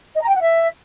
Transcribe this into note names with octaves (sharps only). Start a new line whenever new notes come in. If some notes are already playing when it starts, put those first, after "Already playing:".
D#5
A#5
G5
F#5
E5